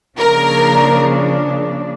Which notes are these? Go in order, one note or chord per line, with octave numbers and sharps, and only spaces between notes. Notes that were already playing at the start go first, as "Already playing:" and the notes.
C#3 F3 A#3 D4 A#4